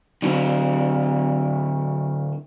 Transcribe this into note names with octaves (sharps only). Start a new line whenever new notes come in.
D3 F#3